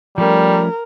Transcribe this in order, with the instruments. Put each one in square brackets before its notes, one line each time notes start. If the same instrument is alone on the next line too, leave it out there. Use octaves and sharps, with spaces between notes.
[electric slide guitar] F3 A3 C#4 [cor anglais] G3 [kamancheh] A#4